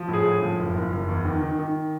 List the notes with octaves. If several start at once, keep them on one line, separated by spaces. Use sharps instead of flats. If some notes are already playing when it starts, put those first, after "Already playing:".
Already playing: F3
A2
G#4
A2
F3
F#1
F#1
F#1
E2
D#3
D#3
D#3